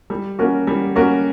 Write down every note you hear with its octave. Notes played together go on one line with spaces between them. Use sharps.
G3
A#3 C#4 F#4 A#4
G3
A#3 C#4 F#4 A#4